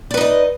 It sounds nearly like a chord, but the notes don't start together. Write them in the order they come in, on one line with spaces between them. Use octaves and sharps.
D5 B4 D#4 D#5